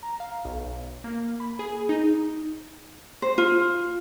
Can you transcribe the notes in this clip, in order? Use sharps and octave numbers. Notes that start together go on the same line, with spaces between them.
A#5
F5
B1
A#3
B5
G#4
D#4
C5
F4